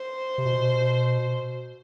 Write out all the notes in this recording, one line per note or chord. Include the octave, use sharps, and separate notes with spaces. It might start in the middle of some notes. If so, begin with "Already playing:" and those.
Already playing: C5
C3
B2